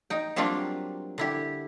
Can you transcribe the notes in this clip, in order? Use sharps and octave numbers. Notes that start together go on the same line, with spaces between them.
D#4 G5
F#3 G3 A#3 C4 D4 F4
D3 E4 G4